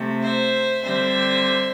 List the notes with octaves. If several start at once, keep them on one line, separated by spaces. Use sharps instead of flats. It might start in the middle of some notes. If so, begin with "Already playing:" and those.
Already playing: C3 A3 C4
C5 E5
D3 G3 C4 C5 E5